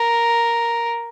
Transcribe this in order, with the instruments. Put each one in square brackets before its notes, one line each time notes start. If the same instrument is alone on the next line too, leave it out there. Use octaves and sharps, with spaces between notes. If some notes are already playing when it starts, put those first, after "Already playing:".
Already playing: [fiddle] A#4